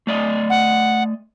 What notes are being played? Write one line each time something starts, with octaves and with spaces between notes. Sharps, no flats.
A3 D5 D#5
F#5